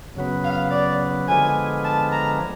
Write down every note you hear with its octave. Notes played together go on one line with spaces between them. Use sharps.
F#2 C#3 F#3 B3
F5
D5
D3 F3 G#3 B3 G#5
A5
A#5